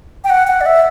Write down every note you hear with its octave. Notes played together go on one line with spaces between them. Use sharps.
G5
F#5
F#5
D5
E5